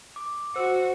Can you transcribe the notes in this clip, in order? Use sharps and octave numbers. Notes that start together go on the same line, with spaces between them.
D6
F#4 C5 E6